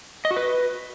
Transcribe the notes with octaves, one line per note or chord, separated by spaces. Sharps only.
D#5
F#4
B4